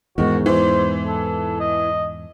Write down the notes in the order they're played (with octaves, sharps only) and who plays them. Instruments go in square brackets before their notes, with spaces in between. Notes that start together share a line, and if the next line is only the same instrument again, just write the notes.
[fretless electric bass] E2 G#2 [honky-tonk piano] D#3 [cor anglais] F#4
[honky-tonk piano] E3 [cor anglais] C5
[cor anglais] A4
D#5